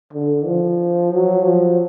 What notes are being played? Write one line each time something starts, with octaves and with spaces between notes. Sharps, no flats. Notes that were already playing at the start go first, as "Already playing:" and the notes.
D3
F3
F#3
F3